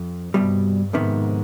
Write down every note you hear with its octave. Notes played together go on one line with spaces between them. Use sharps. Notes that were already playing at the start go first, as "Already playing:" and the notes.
Already playing: F2
C2 G2 B2 G3
F2 G#2 C3 D#3 B3